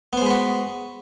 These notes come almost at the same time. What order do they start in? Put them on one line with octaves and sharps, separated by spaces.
B3 C5 G#3 B4 F#4